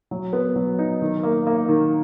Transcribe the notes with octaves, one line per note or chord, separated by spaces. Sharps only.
F#3
B3
F#3
D#4
D#3
A#3
A#3
D#3